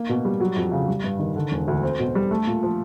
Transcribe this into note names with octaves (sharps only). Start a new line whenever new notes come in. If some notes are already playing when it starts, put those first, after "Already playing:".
Already playing: A#3
B2
G3
F#3
F2
C#3
G3
G2
D#3
D3
E1
D2
C4
B2
G3
A3
A#2
F3